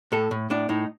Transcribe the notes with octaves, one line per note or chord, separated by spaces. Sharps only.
A2 A4
A2
A2 D4
A2 D#4